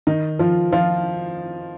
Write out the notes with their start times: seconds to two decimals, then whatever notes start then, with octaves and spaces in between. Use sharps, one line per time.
0.07 D#3 D#4
0.39 F3 F4
0.72 F3 F4